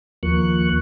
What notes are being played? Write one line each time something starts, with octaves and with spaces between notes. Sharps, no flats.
D#2 F3 A#3 C#6 F#6